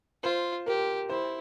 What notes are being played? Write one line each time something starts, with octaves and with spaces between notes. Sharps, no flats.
F4 C5
G4 A#4
E4 C5